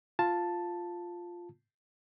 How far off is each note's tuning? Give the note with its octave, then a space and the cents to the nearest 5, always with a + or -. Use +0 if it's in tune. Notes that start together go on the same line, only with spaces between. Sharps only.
F4 +0 A5 +0